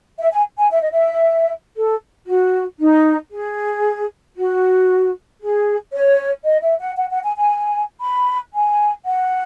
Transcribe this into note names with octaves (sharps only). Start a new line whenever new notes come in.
E5
G#5
G#5
E5
D#5
E5
A4
F#4
D#4
G#4
F#4
G#4
C#5
D#5
E5
F#5
F#5
F#5
G#5
G#5
B5
G#5
F#5